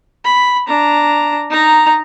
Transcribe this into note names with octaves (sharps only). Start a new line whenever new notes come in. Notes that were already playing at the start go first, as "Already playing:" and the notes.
B5
D4 A#5
D#4 A#5